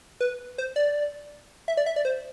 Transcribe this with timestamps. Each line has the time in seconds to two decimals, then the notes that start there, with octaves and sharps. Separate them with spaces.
0.20 B4
0.58 C5
0.76 D5
1.68 E5
1.77 D5
1.86 E5
1.96 D5
2.05 C5